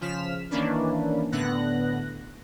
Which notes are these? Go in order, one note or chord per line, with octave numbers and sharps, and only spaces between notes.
C#3 F3 F6 B6 E7
D#3 E3 A#3 C#4 D4 B4
A2 D3 B3 F#6 A#6